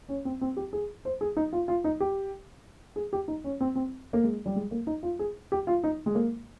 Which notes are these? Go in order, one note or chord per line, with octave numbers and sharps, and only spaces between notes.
C#4
C4
C4
G4
G#4
C5
G#4
D#4
F4
F4
D#4
G4
G#4
G4
D#4
C#4
C4
C4
A#3
G#3
G3
G#3
A#3
D#4
F4
G#4
G4
F4
D#4
G#3
A#3